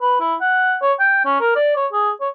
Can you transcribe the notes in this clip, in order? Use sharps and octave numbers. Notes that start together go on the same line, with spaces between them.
B4
E4
F#5
C#5
G5
C#4
A#4
D5
C#5
G#4
C#5